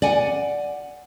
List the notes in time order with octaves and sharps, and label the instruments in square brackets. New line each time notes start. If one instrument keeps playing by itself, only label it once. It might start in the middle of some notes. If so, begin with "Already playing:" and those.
[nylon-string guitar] D5 F#5 G#5